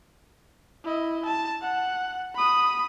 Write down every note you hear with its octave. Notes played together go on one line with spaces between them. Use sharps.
E4 D#5
A5
F#5
B5 D#6